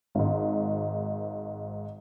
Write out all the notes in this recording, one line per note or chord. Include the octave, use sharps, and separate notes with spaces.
G#1 G#2